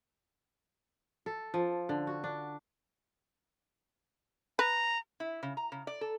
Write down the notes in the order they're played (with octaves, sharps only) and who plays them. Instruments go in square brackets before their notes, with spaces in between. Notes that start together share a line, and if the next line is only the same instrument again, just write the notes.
[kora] A4
F3
D3
F#4
D4
[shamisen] B4 [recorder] A#5
[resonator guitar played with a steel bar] E4
C#3
A#5
C#3
D5
A4